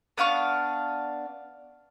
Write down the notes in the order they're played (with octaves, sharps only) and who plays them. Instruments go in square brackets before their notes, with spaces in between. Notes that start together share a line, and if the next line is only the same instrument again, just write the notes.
[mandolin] B3 D4 F5 C#6